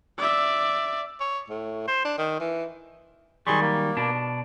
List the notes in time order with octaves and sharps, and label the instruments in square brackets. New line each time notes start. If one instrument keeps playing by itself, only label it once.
[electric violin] D5 E5
[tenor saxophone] C#5
A2
C5
D4
D#3
E3
[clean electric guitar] D#3 F#3 G3 [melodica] G#4 C6 C#6
[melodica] A#3
[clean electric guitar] B2 D4